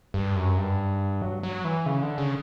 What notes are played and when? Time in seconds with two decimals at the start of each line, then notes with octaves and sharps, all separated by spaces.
0.14 G2
0.35 F#2
0.57 G2
1.22 F#3
1.43 F#3
1.64 E3
1.86 C#3
2.02 D3
2.18 C#3